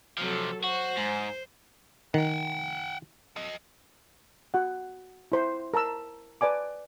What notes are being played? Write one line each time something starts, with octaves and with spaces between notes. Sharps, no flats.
C3 F3 F#3 A4
F#4 C5
G#2
D#3 F#5 G5
A4 D#5
F#4 F#5
E4 C5 C6
A#4 A5 A#5 E6
B4 D5 G#5 D6